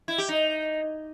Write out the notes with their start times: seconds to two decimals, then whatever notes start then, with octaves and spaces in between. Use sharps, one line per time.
0.08 E4
0.18 G4
0.29 D#4